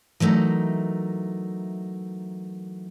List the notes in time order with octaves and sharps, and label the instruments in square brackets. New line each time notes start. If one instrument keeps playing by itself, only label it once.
[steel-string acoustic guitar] E3 F#3 A3 D#4 A#4